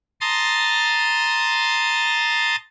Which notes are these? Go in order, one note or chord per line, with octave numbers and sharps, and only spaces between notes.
A5 A#5 C6 D#6 A6